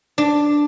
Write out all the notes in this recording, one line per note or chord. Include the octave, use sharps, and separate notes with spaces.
D4